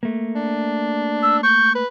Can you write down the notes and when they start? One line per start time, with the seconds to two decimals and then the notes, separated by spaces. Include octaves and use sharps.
0.03 A3 A#3
0.36 D4
1.22 E6
1.43 C#6 G6
1.75 B4